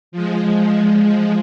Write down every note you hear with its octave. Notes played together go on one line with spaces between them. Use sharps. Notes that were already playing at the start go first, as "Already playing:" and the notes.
F3 G#3